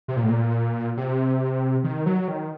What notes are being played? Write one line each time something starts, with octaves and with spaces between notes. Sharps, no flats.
C3
A#2
A2
A#2
C3
D#3
F#3
D#3